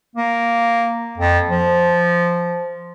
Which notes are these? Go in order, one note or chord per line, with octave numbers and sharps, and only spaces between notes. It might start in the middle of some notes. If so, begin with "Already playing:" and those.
A#3
F2
F3